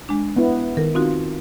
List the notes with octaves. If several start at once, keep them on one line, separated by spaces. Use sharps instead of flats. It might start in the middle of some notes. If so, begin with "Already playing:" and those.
G#3 D4
B3 E4
D#3 A#4
C4 D#4 F4 F#4